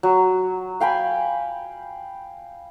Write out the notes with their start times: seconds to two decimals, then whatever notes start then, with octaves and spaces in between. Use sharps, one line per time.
0.03 F#3
0.80 F5 G5 G#5 B5